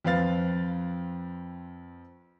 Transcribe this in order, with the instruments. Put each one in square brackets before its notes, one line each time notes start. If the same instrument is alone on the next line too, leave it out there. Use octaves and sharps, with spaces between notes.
[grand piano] F2 C4 B4 F5 A6